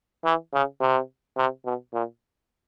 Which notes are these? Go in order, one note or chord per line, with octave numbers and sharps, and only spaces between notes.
E3
C#3
C3
C3
B2
A#2